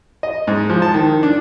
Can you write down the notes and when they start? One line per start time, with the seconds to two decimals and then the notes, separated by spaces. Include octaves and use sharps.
0.23 D#5
0.47 G#2
0.69 F3
0.82 A5
0.94 D#3
1.23 D4